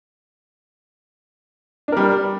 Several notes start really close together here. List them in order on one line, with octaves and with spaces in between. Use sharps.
D4 A#4 G3